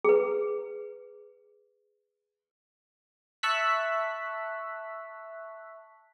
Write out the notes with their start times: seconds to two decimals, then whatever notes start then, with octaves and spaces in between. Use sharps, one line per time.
0.04 G#4 B4
3.43 E5 A5 C#6 E6 F#6 B6